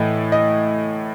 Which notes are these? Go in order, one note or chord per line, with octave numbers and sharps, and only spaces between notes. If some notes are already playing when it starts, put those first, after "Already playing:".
Already playing: A2 E3 A3 D#5
D#5